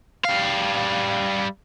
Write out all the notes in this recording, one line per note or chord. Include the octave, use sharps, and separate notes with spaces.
G3 F5